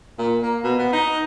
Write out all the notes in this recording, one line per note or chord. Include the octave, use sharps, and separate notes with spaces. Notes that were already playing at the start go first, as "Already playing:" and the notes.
A#2
A#3
B2
B3
D#4